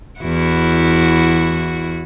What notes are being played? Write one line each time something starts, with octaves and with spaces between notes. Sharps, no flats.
E2 E4 F#4